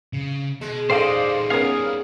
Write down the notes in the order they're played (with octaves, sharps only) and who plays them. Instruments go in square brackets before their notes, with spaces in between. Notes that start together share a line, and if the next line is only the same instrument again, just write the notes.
[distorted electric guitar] C#3
[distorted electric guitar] B2 [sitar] G#3
[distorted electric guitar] G3 D#4 [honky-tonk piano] A4 F5 [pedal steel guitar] C5 D5 D#5
[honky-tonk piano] B3 C#4 A#4 [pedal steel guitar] F5 G#5 D#6